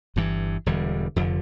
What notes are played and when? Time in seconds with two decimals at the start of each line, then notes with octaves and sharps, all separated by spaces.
0.16 G1 G2 E3
0.66 E1 E2 D3 G3
1.16 F1 F2 D3